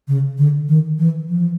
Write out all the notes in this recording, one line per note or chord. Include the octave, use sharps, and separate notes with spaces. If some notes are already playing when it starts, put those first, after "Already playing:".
C#3
D3
D#3
E3
F3